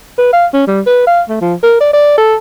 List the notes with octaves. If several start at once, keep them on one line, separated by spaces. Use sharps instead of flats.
B4
F5
C#4
G3
B4
F5
A3
F3
A#4
D5
D5
A4